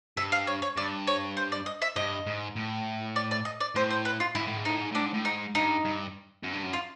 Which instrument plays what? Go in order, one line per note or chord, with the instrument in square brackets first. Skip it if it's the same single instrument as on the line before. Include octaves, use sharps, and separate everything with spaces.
[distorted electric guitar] G2 [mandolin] E5
[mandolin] F5
C#5
C#5
[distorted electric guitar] G2 [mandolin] D5
[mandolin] C#5
C5
D5
D#5
E5
[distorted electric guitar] G2 [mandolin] D#5
[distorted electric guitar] G#2
A2
[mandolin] D5
D5
D#5
D5
[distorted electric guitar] A2 [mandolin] C5
[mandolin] C5
B4
F4
[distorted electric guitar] G#2 [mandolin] E4
[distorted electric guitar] A2
G#2
[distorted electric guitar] A2 [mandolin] D#4
[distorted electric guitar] G#2
[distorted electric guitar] A2 [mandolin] D4
[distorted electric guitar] G#2
A2
[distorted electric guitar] G#2 [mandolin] D#4
[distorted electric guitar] G2 [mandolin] D#4
[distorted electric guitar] G2
F#2
G2
F#2
[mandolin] F4